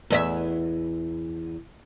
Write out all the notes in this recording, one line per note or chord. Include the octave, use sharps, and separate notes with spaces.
E2 D#5 E5